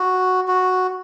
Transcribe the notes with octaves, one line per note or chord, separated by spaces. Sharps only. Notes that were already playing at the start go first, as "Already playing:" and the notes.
Already playing: F#4
F#4